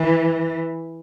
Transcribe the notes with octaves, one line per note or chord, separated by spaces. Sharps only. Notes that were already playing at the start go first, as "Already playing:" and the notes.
Already playing: E3